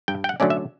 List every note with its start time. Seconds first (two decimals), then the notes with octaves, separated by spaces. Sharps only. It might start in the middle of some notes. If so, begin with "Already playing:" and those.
0.08 G2 G5
0.24 G5
0.29 F#5
0.40 D3 F#3 A3 C#4 D5
0.50 E5